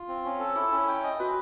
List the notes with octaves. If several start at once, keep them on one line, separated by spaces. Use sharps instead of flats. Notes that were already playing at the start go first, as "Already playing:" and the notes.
Already playing: F4
C4
C#4
A4
E4 G#4
C#4
G5
D#5
F#4 B4